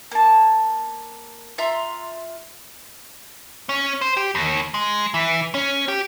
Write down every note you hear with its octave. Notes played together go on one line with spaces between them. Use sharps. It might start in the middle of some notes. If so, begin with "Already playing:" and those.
A#3 A5
F4 E5 A#5 C6
C#4
C5
G4
D#2
G#3
E3
C#4
G4